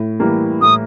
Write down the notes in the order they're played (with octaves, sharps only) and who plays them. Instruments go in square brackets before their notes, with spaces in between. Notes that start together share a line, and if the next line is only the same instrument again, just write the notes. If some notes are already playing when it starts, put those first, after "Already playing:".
Already playing: [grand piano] A2
E3 G3 A#3
[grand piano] A2 [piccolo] D#6